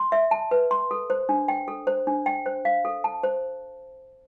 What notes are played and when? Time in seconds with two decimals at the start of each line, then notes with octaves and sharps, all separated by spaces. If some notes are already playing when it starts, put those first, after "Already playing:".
Already playing: C6
0.12 E5
0.31 A5
0.51 B4
0.71 C6
0.91 A4
1.10 C5
1.29 D4
1.48 G5
1.68 A4
1.87 C5
2.07 D4
2.26 G5
2.46 C5
2.65 F5
2.85 A4
3.04 A5
3.23 C5